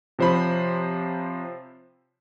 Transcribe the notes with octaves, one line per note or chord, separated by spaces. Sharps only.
C3 F3 C5 C#5 B5